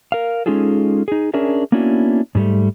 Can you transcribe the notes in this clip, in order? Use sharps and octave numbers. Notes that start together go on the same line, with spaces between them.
A#4 F5
G#3 C#4 D#4 F4 G#4 A4
D#4 G#4
C#4 D4 G#4 A#4 E5
A#3 B3 C#4 D4 E4 F#4
G#2 G3 A3